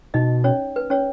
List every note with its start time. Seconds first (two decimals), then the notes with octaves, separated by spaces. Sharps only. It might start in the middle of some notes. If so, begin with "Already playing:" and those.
0.14 B2 D#4 D#5
0.44 C#4 C#5
0.76 B4
0.90 C#4 C#5